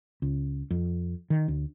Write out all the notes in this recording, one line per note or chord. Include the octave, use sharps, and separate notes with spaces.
C#2
F2
D#3
D2